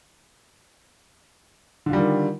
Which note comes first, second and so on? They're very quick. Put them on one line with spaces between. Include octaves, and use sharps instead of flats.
D3 F4 G3 D#3